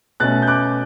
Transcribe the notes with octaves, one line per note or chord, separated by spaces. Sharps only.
B2 A3 C#4 F#6 A6
G6
D6 F#6